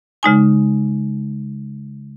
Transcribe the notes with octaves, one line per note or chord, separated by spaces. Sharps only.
C#3 G#3 D#4 G#5